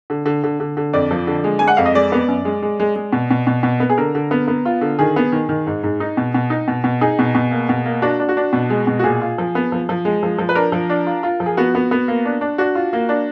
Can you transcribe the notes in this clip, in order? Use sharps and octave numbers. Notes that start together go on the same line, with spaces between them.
D3
D3
D3
D3
D3
F2 D5
F3
D3
G#3
G#3 G#5
F#5
F2 F5
D#5
G#3 D5
B3
F#2
G#3
G#3
G#3
G#3
B2
B2
B2
B2
B3
G#4
D3 A#4
D3
B3
B3
F4
D3
D#3 G#4
B3
D#3
D#3
G#2
G#2
D#4
B2
B2
D#4
B2
B2
D#4 G#4
B2
B2
A#3
B2
A#3
D4 F#4
D4
F#4
D4
B2
G#3
B2
F#4
A#2 G#4
F4
F3
B3
F3
F3
G#3
F3
F3
B4
D4 A#4
F3
D4
F4
F4
F3
G#4
B3 F#4
B3
B3
A#3
D4
D4
D4 F#4
F4
A#3
D4